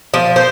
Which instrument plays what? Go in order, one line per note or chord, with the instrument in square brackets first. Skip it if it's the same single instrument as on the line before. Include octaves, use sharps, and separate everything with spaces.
[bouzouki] F3
C5